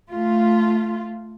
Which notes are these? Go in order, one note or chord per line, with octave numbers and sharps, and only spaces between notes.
A3 F4